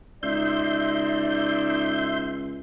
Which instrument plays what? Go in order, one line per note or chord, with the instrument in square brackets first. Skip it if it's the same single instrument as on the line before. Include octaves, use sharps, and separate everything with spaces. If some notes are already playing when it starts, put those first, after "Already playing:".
[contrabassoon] C#2 [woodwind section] D#4 D5 [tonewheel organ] E5 C6 G6